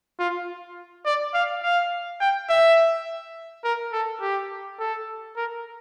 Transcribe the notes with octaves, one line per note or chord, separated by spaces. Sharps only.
F4
D5
F5
F5
G5
E5
A#4
A4
G4
A4
A#4